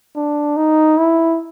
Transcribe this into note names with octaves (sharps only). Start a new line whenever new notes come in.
D4
D#4
E4